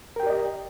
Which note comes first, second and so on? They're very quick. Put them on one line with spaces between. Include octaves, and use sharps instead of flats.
A#4 G5 G4 D5 D#5